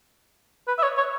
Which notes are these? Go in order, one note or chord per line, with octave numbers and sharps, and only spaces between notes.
B4
E5
C#5
C#5